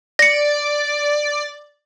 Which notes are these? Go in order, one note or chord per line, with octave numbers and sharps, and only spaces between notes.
D5 A#6 C#7